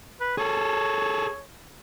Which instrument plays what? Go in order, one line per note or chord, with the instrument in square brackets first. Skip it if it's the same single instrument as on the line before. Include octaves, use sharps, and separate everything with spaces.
[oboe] B4
[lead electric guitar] G#4 A4 [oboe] C#5